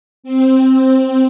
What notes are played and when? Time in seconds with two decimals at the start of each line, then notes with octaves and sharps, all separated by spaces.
0.23 C4